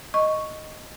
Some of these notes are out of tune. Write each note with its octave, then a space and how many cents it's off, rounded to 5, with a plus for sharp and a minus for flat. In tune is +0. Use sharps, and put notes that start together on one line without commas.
D#5 +0 C#6 +0